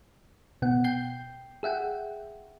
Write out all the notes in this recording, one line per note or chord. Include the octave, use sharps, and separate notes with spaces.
B2 B3 F#5
G5 G6 C7
G#4 E5 F#5 G5